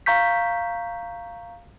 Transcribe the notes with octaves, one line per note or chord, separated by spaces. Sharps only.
F5 A#5 C#6 G6 B6